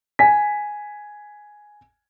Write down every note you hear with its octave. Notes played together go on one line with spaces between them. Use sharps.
G#5 B6